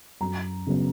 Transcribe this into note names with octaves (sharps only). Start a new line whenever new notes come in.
F#2 A#5
C#3 F#3 B3